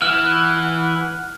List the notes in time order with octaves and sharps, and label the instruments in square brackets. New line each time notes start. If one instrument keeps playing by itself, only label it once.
[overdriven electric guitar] E3 [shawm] F#5 [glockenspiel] F6